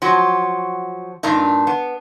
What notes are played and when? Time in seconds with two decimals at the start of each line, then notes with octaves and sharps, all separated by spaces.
0.02 F3 F#3 F#4
1.23 G2 A#2 D4 D#4
1.67 B3